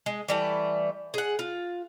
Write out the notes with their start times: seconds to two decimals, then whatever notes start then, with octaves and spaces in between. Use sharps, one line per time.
0.06 G#3
0.28 E3 G3 A3
1.14 G#4 F#5
1.39 F4